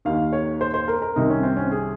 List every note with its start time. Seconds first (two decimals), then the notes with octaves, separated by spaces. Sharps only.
0.05 D#2 D#3 F5
0.33 C#5
0.61 C5
0.74 C5
0.88 A#4
1.02 A#4
1.16 C2 C3 D#3 D#4
1.30 C#4
1.43 C4
1.57 C#4
1.71 G#4